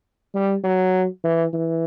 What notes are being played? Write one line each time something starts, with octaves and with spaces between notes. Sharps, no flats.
G3
F#3
E3
E3